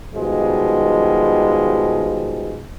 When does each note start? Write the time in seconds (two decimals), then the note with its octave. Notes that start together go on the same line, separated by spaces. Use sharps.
0.14 B2 D#3 F3 G3 G#3